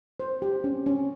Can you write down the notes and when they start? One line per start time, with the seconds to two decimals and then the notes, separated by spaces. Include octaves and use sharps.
0.20 C5
0.42 G4
0.64 C#4
0.86 C#4